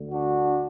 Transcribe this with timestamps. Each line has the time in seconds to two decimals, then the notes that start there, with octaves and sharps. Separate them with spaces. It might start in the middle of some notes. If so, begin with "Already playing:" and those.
Already playing: D2 D3
0.10 D4 F#4